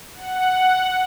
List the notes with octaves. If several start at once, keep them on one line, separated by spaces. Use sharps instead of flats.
F#5